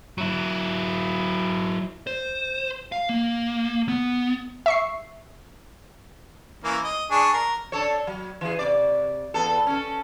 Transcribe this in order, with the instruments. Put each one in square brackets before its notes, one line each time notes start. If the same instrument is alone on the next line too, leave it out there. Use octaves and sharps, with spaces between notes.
[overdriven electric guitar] F#3 E4
[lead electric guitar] C5
F5
A#3
B3
[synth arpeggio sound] E5 C#6 C7
[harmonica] E3 A#3 C#4
D#5
D4 G#4 C#6
A#4
[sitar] D4 A4 C#5
F#3
E3 G#4
C3 D5
E2 B3 A4
C#4 A4